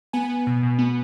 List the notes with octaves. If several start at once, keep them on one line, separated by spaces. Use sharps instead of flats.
B3 G#5
B3
B2
B2
B3